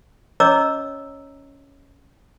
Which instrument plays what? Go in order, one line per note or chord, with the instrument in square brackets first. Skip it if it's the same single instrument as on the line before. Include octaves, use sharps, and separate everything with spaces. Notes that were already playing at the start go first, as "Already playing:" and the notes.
[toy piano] C#4 C#5 D#5 A#5 D6 E6